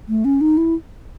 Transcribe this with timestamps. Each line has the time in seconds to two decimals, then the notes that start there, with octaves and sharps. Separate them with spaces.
0.09 A3
0.25 C#4
0.41 D#4
0.57 E4